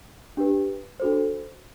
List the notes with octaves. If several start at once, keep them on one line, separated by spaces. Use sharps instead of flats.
D4 G4 B4
D4 F#4 A4 C5